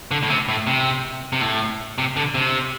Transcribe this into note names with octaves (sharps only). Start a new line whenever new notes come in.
D3
A2
C3
A2
C3
C3
A2
C3
D3
C3